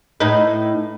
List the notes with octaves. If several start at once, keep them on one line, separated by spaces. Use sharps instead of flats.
A2 D#4 B4